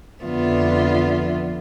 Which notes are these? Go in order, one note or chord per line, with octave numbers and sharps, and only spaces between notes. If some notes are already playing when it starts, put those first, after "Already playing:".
F2 D3 F3 B3 F4 E5